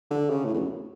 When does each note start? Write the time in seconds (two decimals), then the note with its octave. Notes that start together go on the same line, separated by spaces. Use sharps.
0.11 D3
0.30 C#3
0.45 A2
0.54 E2
0.59 F#2